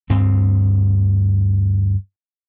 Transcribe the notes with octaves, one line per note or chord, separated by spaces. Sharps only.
D2 G2 C4